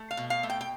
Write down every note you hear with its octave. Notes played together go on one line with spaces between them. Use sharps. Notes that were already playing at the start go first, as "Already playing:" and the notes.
Already playing: A3
F5
B2
F5
A3
G5
G5